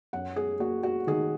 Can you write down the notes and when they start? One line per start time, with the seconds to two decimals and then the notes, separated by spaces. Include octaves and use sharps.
0.13 F#2 F#5
0.36 G#4
0.60 A#3 F#4
0.83 F#4
1.07 D#3 G#4